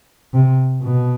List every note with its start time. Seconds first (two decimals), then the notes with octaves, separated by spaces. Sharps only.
0.34 C3
0.83 B2